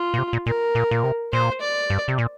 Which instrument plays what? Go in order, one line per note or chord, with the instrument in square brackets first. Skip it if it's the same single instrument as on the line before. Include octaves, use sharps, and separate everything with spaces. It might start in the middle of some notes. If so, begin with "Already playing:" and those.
Already playing: [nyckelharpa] F4
[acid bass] A#2
C3
A#2
[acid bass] A#2 [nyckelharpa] A#4
[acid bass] A#2
A#2
C3
[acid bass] A#2 [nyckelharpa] C5
[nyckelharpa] D5
[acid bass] G2
C3
A#2